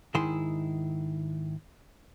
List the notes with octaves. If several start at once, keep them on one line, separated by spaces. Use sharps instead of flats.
G#2 D#3 E4 G#4 C6